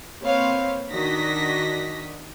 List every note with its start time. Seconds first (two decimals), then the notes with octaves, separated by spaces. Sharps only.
0.23 A#3 C4 B4 C#5 F5
0.91 D#3 D4 F#4 D#5 A#6 B6